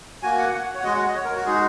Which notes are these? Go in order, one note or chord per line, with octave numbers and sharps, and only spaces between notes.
A#3 F#4 G#5
F#5
F#5
C#5
F#5
G#3 F#4 D#5
F#5
D#5
C#5
A#4
F#4
G#3 D#4 F#4 G#4